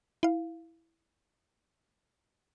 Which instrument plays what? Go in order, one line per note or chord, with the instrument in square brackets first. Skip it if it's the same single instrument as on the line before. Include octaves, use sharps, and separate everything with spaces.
[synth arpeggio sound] E4 F5